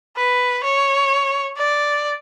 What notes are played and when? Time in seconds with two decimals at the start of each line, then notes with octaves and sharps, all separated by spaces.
0.17 B4
0.64 C#5
1.57 D5